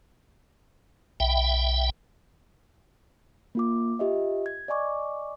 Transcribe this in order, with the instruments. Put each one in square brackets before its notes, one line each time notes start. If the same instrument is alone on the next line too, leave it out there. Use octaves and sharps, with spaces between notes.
[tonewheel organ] B1 E5 G5
[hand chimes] A#3 F4 D6
F4 G4 D#5 E5
G#6
D5 D#5 G#5 C#6 D6